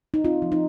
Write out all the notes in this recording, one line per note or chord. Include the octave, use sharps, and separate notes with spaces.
D#4
C4 F4
F3
D#4